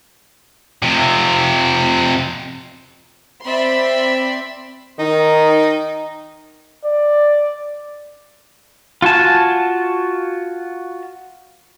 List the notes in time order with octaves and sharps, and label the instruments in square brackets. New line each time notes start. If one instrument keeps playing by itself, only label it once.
[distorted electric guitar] F2 C3
[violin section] C4 D5 E5 B5 C6
[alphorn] D#3 [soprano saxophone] D#4
[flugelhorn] D5
[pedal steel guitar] F4 F#4 G#5 A5